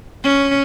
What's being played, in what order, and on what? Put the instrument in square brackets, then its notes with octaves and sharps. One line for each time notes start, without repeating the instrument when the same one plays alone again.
[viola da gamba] C#4